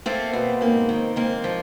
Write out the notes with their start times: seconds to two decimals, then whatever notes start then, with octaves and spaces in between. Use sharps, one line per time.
0.06 A3 A#3 C4
0.33 B2
0.61 G#2 A#3 C4
0.89 D#3
1.16 G#2 A#3 C4
1.44 F3